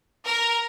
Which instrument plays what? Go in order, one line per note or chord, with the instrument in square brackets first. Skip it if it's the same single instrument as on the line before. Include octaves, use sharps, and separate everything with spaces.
[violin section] A#4